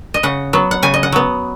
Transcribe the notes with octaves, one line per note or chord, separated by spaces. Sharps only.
D#5
C#3 F#5
F#3 B3
F#5
C#3 G#5
D#5
F#5
F#3 B3